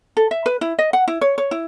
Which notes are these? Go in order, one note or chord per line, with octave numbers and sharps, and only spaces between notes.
A4
E5
B4
E4
D#5
F#5
E4
C#5
C#5
E4